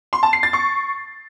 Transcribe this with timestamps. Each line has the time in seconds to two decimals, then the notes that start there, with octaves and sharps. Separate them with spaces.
0.13 C6
0.23 A5
0.33 C7
0.43 A6
0.53 C#6